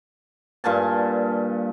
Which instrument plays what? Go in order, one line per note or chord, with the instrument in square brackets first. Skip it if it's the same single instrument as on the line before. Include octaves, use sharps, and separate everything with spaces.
[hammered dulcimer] G2 A#2 G#5 A5